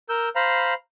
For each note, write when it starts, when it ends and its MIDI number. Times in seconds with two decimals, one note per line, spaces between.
0.09 0.29 70
0.09 0.29 88
0.09 0.29 91
0.36 0.74 72
0.36 0.74 77
0.36 0.74 82
0.36 0.74 83